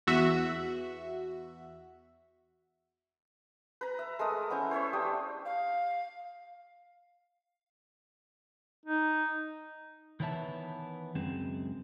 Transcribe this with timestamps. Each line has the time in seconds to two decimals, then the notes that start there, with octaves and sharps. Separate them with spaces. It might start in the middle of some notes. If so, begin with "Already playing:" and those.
0.07 E2 F#4 E5
3.81 B4 A#5
3.99 E5
4.19 G#3 A3 A#4 D#6
4.50 B3 C#4 E4 C5
4.71 C5 C#5 E5 C#6
4.93 D4 G4 G5 D#6
5.45 F5
8.86 D#4
10.20 D#3 E3 B3 C#5 E5 A5
11.15 C#2 F#2 G#3 C4